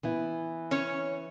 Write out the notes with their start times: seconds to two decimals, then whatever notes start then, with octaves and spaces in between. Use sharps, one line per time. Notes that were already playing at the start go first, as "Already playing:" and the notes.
0.03 E3 B3 E4
0.71 C#4 C#5